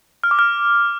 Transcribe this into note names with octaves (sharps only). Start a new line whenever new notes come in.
F6
D6
F6